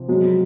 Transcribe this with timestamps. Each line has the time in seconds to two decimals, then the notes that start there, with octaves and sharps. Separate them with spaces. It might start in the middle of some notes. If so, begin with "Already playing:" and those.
Already playing: C3 F3
0.08 F#3 G#3